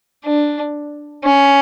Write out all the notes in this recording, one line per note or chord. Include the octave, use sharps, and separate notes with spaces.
D4
C#4